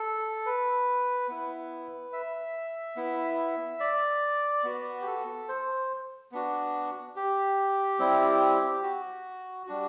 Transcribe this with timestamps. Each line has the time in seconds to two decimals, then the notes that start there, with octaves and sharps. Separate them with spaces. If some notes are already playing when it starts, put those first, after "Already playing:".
Already playing: A4
0.46 B4
1.29 B3 E4
2.13 E5
2.96 B3 E4
3.80 D5
4.64 B3 F#4
5.02 G4
5.07 A4
5.49 C5
6.32 B3 D4 F#4
7.16 G4
7.99 G3 C4 E4
8.83 F#4
9.67 G3 D4 F#4